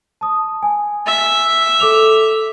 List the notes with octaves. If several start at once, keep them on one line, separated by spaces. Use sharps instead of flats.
A5 D#6
G#5
E5
A4 D6 F7